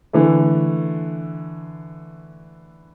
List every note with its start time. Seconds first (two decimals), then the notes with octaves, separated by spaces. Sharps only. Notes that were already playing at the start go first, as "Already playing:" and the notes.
0.13 D3 E3 A3